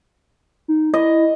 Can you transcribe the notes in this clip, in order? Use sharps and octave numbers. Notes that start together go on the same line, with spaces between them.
D#4
E4 D#5